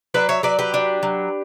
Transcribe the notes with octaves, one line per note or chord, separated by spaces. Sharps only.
F#3 B4 D5
C#5 E5
F#3 B4 D5
G4 B4
D4
F#3